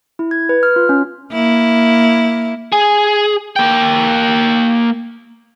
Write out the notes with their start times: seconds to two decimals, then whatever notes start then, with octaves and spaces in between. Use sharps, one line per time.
0.19 E4
0.31 G#6
0.49 B4
0.63 F6
0.76 F4
0.89 C#4
1.32 A#3 E4
2.72 G#4
3.56 A#3 G5